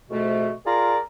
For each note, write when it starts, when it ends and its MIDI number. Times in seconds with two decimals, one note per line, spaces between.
0.11 0.50 41
0.11 0.50 44
0.11 0.50 47
0.11 0.50 57
0.66 0.98 65
0.66 0.98 68
0.66 0.98 70
0.66 0.98 74
0.66 0.98 82